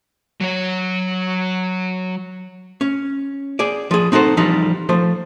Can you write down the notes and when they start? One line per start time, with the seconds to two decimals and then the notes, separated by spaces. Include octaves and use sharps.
0.41 F#3 C#5
2.81 C#4
3.59 G#4 D5
3.91 F3 G#4
4.12 C4 D#4 F#4 A4 C5
4.37 E3 F3 G3 D#4
4.89 F3 A3 C5